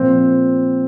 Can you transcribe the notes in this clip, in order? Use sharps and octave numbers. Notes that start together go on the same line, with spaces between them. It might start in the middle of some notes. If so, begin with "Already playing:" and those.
Already playing: A#2 F3 C4